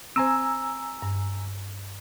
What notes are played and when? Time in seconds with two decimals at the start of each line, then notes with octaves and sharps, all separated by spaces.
0.16 C4 C5 G#5 A#5 E6
1.02 G2